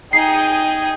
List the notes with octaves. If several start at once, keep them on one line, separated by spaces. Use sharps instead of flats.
D#4 G#4 G5 C7